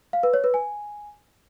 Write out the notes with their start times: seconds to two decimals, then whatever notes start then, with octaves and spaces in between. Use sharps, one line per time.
0.13 F5
0.23 B4
0.34 C#5
0.44 B4
0.54 G#5